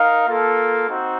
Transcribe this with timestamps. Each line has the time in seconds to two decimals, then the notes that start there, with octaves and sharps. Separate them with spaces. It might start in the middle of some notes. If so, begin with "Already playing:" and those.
Already playing: D#4 A#4 F5
0.26 A#3 F4 A4
0.88 C4 D#4 F#4